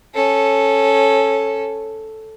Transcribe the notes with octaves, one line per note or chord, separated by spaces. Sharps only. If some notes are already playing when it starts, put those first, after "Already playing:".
C#4 A4